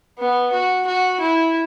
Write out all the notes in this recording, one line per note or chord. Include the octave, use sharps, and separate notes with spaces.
B3
F#4
F#4
E4